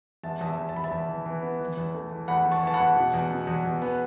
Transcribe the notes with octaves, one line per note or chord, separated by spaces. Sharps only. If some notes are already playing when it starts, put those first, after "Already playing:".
E2 E5 A5
E2
E5
E2
A5
E2 B5
E5 A5
E2
E3
E3
B3
E3
E2
A3
E3
E2 F#5 B5
E2
A5 C#6
E3 A5
F#5 B5
E2
B2
E2
B2
E2
E2
B3